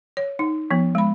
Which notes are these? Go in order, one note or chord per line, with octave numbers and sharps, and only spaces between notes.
C#5
D#4
F3 B3
G#3 B5